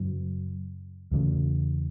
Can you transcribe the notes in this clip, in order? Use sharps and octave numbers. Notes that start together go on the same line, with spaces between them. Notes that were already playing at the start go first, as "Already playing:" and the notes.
Already playing: F#2 C#3 F#3
E2 C#3